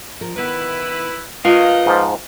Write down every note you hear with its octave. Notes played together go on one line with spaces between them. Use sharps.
F3 A#4
D#3 B3 E4 B4
D#4 F4 A#4 B4 D#5 F5
G#2 F3